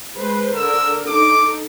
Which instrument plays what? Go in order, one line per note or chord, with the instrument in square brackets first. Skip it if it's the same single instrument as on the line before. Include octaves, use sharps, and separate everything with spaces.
[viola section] G#3 B4 C5
[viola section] D3 A#4 [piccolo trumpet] E6
[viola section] D#4 A4 [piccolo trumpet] D6